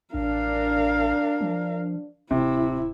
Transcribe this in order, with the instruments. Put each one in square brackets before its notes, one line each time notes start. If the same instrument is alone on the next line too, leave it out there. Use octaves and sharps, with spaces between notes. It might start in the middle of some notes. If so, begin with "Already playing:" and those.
[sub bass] A1 [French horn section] D4 [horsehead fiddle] A#4 F5
[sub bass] F3
[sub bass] D1 [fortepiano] C3 [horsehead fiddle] E4